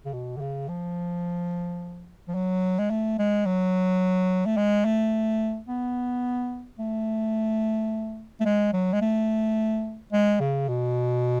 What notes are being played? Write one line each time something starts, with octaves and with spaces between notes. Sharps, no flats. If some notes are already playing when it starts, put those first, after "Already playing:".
C#3
B2
D3
C#3
F3
F3
F#3
G#3
A3
G#3
F#3
A3
G#3
A3
B3
A3
A3
G#3
F#3
G#3
A3
G#3
C#3
B2